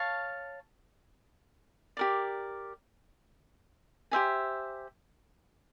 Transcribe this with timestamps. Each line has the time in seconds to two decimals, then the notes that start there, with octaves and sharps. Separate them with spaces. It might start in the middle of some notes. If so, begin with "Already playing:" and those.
Already playing: C#5 F5 A5
1.97 G4 A#4 D5
4.11 G4 C5 E5 G#5